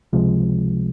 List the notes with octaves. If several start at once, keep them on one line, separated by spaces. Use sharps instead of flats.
C#2 C3 F3 G#3